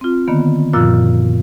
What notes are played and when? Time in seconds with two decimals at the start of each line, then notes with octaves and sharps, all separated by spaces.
0.01 C4 F4
0.28 D3 D#3 A#3 B3
0.73 F#2 A#2 F3 F4 E6 F#6